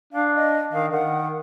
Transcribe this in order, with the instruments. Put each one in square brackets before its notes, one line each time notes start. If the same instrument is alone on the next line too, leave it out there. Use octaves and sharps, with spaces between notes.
[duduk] D4 [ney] F5
[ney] D#5
[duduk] D#3 [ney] F5
[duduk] D#3 [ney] F#5